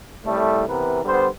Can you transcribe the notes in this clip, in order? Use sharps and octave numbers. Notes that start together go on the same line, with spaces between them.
C2 A2 G3 A3
C3 E3 B3 A#4 B4
D3 G3 B3 C5